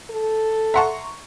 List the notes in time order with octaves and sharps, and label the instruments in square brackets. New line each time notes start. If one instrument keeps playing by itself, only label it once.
[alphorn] A4
[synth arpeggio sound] E5 F#5 A5 [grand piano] A#5 C6 C#6